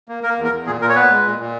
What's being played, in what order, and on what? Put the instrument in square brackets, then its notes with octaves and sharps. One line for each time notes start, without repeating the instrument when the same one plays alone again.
[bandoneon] A#3
A#3 A#4
E2
A#4
E2
A#2 G#4
A#2 A#4
C#5
B3 B4
G#3
A#2
A#2